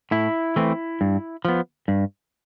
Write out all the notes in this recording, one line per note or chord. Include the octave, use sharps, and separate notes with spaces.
A2 E4
E3 A3 C4
G2
F3 B3
G2